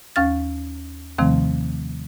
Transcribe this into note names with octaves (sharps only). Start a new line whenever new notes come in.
D#2 C#4 F5 F6 A6
D#2 C3 D#3 F3 A3 C4